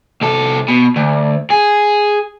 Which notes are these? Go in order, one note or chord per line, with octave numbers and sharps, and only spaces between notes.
C2 A4
B2
D2
G#4